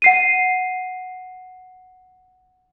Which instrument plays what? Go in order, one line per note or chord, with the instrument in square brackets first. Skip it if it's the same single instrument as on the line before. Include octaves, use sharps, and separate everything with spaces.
[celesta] F#5 C7 D#7